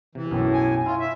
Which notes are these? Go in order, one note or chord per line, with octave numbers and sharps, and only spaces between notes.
C3 E3
B1 F#2 A2
G#5
E4 F4 C#5
E5